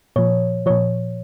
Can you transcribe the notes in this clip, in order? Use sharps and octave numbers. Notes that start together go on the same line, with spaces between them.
A#2 F3 C#5
A#2 F3 C#5